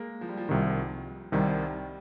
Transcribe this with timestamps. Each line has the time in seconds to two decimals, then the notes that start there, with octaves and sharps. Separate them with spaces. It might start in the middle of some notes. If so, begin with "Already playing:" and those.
Already playing: G#3 A#3
0.21 F3
0.29 G3
0.37 F3
0.49 C2 C3 D#3 F3
1.32 C2 C3 D#3 G3